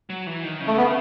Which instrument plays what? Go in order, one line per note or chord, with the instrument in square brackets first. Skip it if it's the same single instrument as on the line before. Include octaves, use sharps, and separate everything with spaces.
[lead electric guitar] F#3
E3
D#3
C#3
[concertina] A3
B3